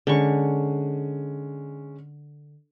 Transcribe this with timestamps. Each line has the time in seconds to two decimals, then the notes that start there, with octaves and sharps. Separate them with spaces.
0.07 D3 G#3 C#4 C#6